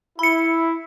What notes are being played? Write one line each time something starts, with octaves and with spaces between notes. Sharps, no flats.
E4 B5 C#7